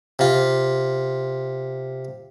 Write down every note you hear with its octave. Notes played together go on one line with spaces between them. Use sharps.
C3 F4